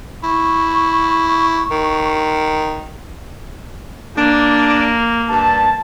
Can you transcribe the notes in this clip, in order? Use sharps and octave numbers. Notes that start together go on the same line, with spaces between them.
E4 C#6
D#3
A#3 D4
G2 A5